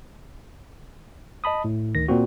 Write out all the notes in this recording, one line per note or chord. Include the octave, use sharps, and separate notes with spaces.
D#5 A5 B5 D#6
A2
D2 D#3 A#6
A#2 A#3 C4 F#4